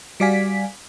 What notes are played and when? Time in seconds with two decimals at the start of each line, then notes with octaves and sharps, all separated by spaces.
0.20 G3 F#4 D5 F5 G#5 B6